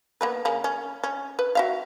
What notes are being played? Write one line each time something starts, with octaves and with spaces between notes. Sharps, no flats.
A#3 B3 B4
C#3 A#3
C#4
C#4
B4
F#4 E5 F5